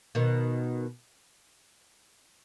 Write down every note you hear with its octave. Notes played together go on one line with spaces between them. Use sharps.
B2 D#3